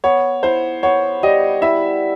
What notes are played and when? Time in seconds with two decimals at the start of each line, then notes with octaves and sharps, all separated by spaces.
0.04 B3 C#5
0.43 E4 C5
0.83 B3 C#5
1.23 G3 D#5
1.62 E4 E5